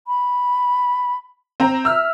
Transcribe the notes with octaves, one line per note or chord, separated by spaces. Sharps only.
B5
C4 A#5
E5 E6 F6